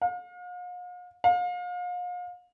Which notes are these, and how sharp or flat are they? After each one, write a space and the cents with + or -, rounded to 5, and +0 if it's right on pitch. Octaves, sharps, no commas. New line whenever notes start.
F5 +45
F5 +40